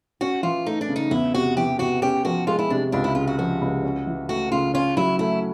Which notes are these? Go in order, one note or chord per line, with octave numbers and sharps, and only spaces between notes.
C#4 F#4
E3 F4
A3 D#4
D4
C#3
D#4
E2 E4
C3 F#4
E3 G4
E2 F#4
C#4 G4
F3 F#4
G#3 F4
E4
C3 D4
C#2 D4
E4
C#3 F4
F#4
F3 F#4
C#2
C#4
E3
A3 F#4
C#3 F4
C#4 F4
F#3 E4
A3 E4